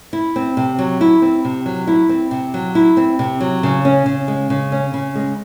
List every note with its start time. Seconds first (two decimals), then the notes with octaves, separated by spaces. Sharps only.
0.13 E4
0.36 C4
0.57 C3
0.79 F#3
1.01 E4
1.22 C4
1.45 C3
1.66 F#3
1.87 E4
2.09 C4
2.31 C3
2.54 F#3
2.75 E4
2.97 C4
3.19 C3
3.40 F#3
3.63 C#3
3.85 C#4
4.06 C#3
4.28 G#3
4.50 C#3
4.72 C#4
4.94 C#3
5.15 G#3